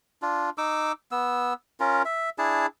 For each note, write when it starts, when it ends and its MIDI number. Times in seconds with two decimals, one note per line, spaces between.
0.22 0.50 62
0.22 0.50 65
0.58 0.92 63
0.58 0.92 86
0.58 0.92 88
1.11 1.53 59
1.11 1.53 88
1.80 2.02 61
1.80 2.02 65
1.80 2.02 70
2.05 2.30 76
2.38 2.67 62
2.38 2.67 64
2.38 2.67 68
2.38 2.67 81